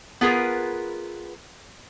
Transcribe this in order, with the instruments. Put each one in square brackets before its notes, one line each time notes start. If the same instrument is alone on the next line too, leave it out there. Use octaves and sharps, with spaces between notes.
[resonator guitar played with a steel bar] B3 F4 G#4 A#4 B4